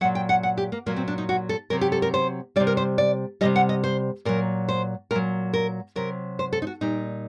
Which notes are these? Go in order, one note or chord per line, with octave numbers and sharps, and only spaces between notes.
A#2 F#3 F#5
G5
F#5
F#5
G4
A#3
A#2 F#3 A#3
C4
D4
D#4
F#4
A4
C3 F#3 A#4
G4
A4
A#4
C5
C3 G3 D5
A#4
C5
D5
C3 D#3 G3 D#5
F#5
D#5
C5
A#2 F#3 A#4
C5
A#2 F#3 A#4
A#4
C3 F#3 A#4
C5
A4
D#4
F#4
A#2 G3 D#4